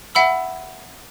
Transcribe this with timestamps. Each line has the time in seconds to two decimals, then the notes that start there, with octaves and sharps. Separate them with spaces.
0.15 E5 F#5 B5 E6